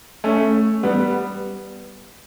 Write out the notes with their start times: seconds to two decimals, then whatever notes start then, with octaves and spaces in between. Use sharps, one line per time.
0.24 A3 C#4
0.83 G3 B3